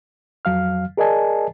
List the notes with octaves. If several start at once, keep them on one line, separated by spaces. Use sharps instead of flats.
F2 F#3 F5 F6
G#4 A#4 D5 D#5 G#5 A5